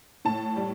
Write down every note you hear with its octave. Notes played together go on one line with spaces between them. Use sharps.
A2 A5
G3